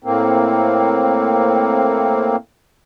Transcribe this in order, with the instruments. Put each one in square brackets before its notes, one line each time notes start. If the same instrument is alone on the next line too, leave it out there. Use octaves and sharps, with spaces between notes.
[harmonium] A2 A#3 C4